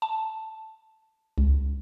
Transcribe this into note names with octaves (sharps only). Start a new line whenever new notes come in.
A5
C#2